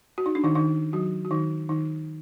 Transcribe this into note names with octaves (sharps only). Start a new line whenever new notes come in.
F#4
D#4
D4
D#3 D#4
D#3 D#4
F#3 F#4
F#4
D#3 D#4
D#3 D#4